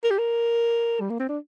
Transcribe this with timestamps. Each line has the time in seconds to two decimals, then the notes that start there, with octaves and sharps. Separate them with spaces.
0.04 A#4
0.10 G4
0.18 A#4
1.00 G3
1.10 A#3
1.19 C4
1.29 D4